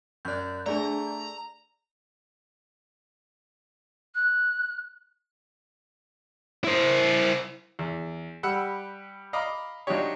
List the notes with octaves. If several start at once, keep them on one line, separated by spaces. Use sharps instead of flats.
F#2 D5 F#6 G6
A3 D4 G#4 D5 A#5
F#6
E4 C5
E2
G3 G4 F#5 B5 E6
D#5 F5 A#5 B5 D6
F#3 D4 D#4 F4 G4 C#5